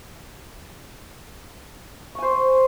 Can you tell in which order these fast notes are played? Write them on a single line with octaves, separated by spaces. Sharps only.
C#6 G#5 C5